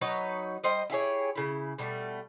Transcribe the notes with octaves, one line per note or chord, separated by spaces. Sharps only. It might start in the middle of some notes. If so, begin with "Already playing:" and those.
F#3 D#4 B4 C#5
G3 C5 D#5
E4 G4 G#4 C#5
C#3 E4
B2 G3 A3